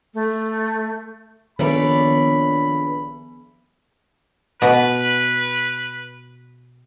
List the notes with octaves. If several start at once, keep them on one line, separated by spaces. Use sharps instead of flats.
A3
A#1 D#3 F3 B3 B4 C#5 D5 B5
B2 B4